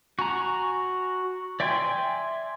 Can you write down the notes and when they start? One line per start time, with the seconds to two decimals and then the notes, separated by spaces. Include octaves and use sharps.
0.19 F#4 G#5 A#5
1.60 D5 E5 G5 G#5 C6